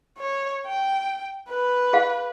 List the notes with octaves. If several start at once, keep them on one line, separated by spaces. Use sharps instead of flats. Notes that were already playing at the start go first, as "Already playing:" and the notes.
C#5
G5
B4
G#4 F5